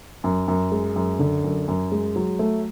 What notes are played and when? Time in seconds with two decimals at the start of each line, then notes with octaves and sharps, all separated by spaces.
0.24 F#2
0.48 F#2
0.72 G#3
0.96 F#2
1.19 D3
1.44 F#2
1.68 F#2
1.92 G#3
2.16 F#3
2.39 A3